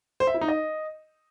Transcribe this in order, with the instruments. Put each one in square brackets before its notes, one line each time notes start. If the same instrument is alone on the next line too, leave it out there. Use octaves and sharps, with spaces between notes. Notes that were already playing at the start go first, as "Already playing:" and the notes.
[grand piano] C5
E5
E4
D#4
D#5